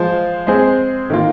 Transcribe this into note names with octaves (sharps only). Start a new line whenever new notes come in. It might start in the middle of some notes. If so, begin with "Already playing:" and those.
Already playing: F3 G#3 F4 C5
G#3 C4 G#4 C5
D#3 A#3 F4